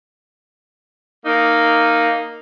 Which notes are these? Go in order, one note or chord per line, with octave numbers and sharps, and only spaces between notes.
A#3 D#4